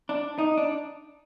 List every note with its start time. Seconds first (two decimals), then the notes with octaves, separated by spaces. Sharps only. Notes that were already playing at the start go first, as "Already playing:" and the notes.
0.09 D4
0.38 D#4
0.57 D4